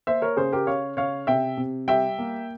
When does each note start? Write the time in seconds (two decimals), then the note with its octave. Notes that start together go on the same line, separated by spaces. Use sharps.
0.07 A#3 C5 E5
0.22 A#4 C#5
0.37 C#3 G#4 C5
0.52 G4 A#4
0.67 C#3 C#5 F5
0.97 C#3 C#5 F5
1.27 C3 E5 G5
1.57 C3
1.88 G3 E5 G5
2.19 A#3